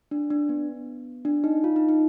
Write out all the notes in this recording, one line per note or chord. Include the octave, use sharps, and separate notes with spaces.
D4
D4
B3
D4
D#4
F4
D#4
D#4